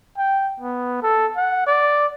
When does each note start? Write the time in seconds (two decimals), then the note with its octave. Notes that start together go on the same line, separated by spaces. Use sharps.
0.18 G5
0.60 B3
1.03 A4
1.37 F#5
1.67 D5